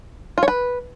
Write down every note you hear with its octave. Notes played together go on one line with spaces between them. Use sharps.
F4
C#5
B4